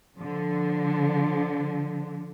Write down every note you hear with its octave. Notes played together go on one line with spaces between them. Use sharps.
D3 F3